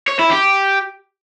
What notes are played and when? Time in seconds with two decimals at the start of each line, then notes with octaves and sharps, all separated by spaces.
0.08 C#5
0.19 E4
0.31 G4